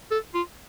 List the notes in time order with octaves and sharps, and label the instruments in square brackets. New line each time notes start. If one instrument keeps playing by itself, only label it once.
[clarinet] A4
F4